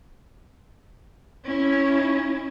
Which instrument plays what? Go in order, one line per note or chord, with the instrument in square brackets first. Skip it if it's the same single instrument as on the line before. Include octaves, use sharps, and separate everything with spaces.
[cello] C#4 E4